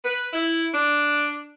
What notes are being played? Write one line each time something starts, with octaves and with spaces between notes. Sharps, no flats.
B4
E4
D4